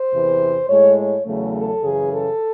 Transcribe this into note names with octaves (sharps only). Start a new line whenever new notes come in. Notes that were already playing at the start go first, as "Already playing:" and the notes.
Already playing: C5
E2 C3 E3
A2 G#3 C#5
C#5
E2 C#3 F#3 A3
A4
F#2 C#3 E3 G#4
A4